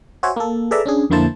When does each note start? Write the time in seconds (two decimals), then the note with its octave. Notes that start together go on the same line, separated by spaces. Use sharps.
0.23 F#4 C5 C#5 E5 G#5
0.36 A#3 A4
0.71 G#4 A4 B4 D5 E5 A#5
0.86 C#4 D4 G#4
1.10 F2 D3 A#3 E4 C5 A5